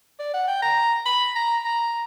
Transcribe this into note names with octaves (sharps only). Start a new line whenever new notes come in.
D5
F#5
G5
A#5
B5
A#5
A#5